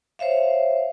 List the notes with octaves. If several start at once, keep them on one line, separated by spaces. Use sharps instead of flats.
C5 C#5 E5 F5